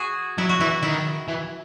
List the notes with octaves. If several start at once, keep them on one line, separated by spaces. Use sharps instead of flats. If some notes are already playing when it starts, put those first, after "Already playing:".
Already playing: F#4 G#4
F#3 E4
F#4
E3 E4
D#3 E4
E3